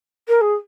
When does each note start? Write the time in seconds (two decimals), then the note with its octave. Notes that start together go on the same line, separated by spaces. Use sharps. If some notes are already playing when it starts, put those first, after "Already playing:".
0.28 A#4
0.41 G#4